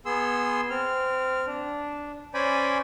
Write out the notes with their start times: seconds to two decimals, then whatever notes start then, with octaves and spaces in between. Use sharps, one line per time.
0.06 B3 G#4 C6 E6
0.70 C4 F6
1.47 D4
2.34 C#4 C5 D5 G#5 B5